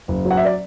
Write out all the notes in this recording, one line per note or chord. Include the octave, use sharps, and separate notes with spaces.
F#1
F#3
F#5
E5
D5